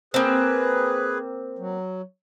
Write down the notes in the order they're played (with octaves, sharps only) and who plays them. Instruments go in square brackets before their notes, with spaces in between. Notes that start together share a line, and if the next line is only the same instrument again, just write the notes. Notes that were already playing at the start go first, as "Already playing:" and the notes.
[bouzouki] A#3 C4 [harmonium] G#4 B4
[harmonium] F#3